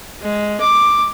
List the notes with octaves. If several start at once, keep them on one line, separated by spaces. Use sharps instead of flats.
G#3
D6